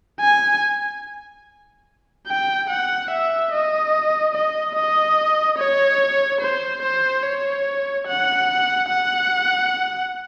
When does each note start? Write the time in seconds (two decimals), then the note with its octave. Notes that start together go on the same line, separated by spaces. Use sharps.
0.21 G#5
2.27 G5
2.70 F#5
3.11 E5
3.52 D#5
4.34 D#5
4.75 D#5
5.58 C#5
6.41 C5
6.82 C5
7.23 C#5
8.06 F#5
8.88 F#5